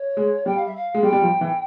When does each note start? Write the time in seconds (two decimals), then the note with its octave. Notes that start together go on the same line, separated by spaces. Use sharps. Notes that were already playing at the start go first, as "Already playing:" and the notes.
Already playing: C#5
0.17 G#3
0.46 G3 G5
0.56 F5
0.66 E5
0.75 F5
0.94 G#3
1.03 G3 G5
1.13 G3
1.22 F3
1.41 E3